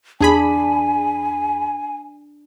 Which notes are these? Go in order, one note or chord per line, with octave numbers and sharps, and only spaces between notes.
E2 D4 G#4 G#5 B5